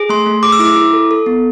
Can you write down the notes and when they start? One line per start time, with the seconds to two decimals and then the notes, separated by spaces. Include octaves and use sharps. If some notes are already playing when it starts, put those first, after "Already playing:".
Already playing: G#4
0.09 A3 C6
0.26 A3
0.43 G#4 D6
0.52 E6
0.59 E4 D6
0.76 E4
0.93 A4
1.11 A4
1.26 B3